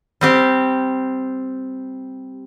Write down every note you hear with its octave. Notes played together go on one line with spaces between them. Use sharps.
G3 C4 G4